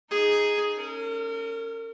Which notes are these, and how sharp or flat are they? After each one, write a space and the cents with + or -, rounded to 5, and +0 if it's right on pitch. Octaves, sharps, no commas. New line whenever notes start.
D#4 +0 G#4 +0
C#4 +5 A#4 -40